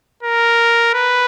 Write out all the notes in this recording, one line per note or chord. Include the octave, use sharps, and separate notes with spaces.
A#4
B4